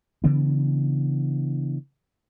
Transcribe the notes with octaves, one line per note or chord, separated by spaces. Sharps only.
C#3 E3 B3 D4